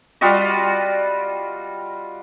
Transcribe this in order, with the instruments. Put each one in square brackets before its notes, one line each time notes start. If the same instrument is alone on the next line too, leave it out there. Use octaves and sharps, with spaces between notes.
[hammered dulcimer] G3 F4 F#4 D#5